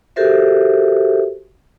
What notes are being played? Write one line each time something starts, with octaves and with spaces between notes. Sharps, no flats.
F#4 G4 A4 A#4 C5 E5